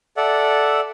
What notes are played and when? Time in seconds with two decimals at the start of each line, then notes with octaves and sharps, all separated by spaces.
0.17 A4 D5 E5 F#5